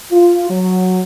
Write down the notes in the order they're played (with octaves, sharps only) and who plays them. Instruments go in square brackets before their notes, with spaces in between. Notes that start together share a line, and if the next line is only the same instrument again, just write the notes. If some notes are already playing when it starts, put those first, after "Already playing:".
[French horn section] F4
F#3